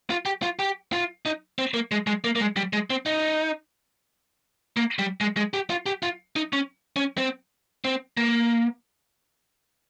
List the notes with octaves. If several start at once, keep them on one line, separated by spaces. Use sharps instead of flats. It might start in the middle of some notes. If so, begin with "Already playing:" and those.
F4
G4
F4
G4
F4
D#4
C4
A#3
G#3
G#3
A#3
A#3
G#3
G3
G#3
C4
D#4
A#3
G3
G#3
G#3
G4
F4
G4
F4
D#4
C#4
C#4
C4
C4
A#3